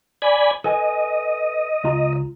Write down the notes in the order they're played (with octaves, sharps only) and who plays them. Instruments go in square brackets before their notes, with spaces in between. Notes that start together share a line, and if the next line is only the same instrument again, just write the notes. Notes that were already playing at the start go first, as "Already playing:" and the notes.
[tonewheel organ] D5 G#5 B5
[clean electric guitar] A4 B4 G#5 [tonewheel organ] D#5
[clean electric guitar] C#2 F4 A#5